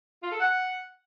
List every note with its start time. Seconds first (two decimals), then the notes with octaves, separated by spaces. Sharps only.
0.23 F4
0.32 A4
0.40 F#5